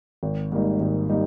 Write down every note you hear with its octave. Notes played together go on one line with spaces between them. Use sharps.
G#1
G#2 G3 A#3 D#4
G#1
G3 A#3 D#4